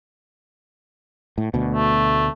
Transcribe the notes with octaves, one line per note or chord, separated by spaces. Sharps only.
A2
D2 B2
A3